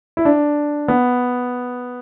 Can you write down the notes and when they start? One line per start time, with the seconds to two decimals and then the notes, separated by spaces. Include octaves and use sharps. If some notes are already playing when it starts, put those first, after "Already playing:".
0.17 E4
0.25 D4
0.88 B3